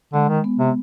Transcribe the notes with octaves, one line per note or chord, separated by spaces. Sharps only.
D3 G#3
D#3
B3
C3